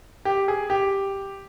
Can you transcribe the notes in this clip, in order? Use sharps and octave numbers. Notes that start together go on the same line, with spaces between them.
G4
G#4
G4